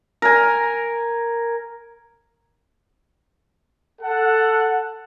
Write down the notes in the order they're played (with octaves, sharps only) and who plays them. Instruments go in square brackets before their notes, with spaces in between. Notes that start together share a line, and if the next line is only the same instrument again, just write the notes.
[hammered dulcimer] A#4 G#5
[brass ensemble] A4 F#5